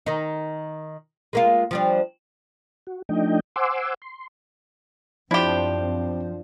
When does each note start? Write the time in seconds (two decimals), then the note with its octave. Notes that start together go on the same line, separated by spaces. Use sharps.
0.06 D#3 D#4
1.33 G#3 A#3 F4
1.71 F3 G3 D4
2.87 F#4
3.09 F3 A3 D4 D#4 D#5 G5
3.56 C5 F#5 G#5 C6 D6 E6
4.02 C6
5.31 F#2 F3 C4 D4 E4 F4 G4 C5